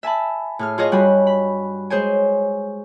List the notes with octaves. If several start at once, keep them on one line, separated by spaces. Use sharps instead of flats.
E5 G#5 A5 B5
A2 G#4 F6
F4 G#4 C#5 D#5 F5
G2 G3 F#4 D#5 G#5 B5
B5
G#3 G#4 C5 C#5 G#5